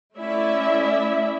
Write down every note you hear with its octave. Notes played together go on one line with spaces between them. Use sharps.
A3 C#4 E4 D5 E5